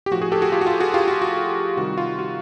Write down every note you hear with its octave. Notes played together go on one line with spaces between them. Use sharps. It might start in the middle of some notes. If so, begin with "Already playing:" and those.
G4
A2 F3 F#4
F#4 G#4
G4 A4
F#4 G#4
F4 G4
F#4
F4
F#4 G#4
F4 G4
F#4
F#4
C3 D#3 G3 F#4
F4
F#4